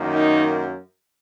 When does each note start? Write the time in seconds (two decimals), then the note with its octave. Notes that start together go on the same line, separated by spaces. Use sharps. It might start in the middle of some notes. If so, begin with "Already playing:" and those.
Already playing: F#2 D#3 A#3
0.13 D#4